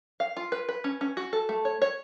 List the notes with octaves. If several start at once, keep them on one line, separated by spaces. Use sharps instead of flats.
F5
F4
B4
B4
C#4
C#4
F#4
A4
A3
C#5
C#5